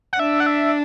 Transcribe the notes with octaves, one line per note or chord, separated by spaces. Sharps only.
F#5
D4 E5
F#5
E5